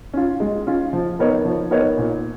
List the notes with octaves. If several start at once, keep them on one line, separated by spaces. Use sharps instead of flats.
C#4 F4
G#3
C#4 F4
F3
B3 D#4 A#4 C#5
F3
B3 D#4 A#4 C#5
A#2